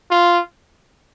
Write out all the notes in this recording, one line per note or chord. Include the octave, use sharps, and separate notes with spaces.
F4